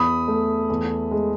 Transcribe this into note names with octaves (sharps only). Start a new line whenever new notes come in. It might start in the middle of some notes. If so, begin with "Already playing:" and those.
Already playing: E2 B5 D#6
A3
E2
G#3